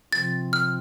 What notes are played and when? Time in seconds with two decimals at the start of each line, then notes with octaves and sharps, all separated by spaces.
0.13 C3 F3 C4 F4 A6
0.53 F6